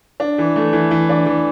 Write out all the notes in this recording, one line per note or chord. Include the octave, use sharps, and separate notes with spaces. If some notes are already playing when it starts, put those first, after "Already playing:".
D4
E3
A3
E3
E3
D4
E3